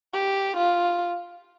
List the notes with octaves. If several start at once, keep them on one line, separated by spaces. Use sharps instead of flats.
G4
F4